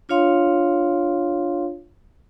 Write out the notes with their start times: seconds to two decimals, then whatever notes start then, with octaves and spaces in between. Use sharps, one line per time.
0.09 D4 F4 C#5 F5 C6